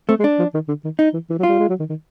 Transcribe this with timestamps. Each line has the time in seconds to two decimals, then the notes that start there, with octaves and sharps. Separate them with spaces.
0.08 A3 C4
0.19 G#3
0.24 D4
0.39 F3
0.54 D#3
0.68 D3
0.84 D#3
0.99 D#4
1.13 E3
1.30 E3
1.39 F#3
1.43 F4
1.49 G3
1.59 G#3
1.69 F#3
1.80 D#3
1.90 D#3